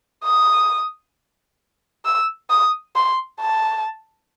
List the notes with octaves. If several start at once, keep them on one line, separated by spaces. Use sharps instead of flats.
D#6
E6
D#6
C6
A5